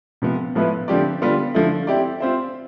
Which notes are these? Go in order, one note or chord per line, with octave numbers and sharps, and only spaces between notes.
C3 F3 B3
A2 F3 B3 E4 B4
D3 F3 C4 G4 D5
D3 G3 B3 F4
D3 F3 A3 E4
C4 E4 G4 D5
C4 F4 C5 E5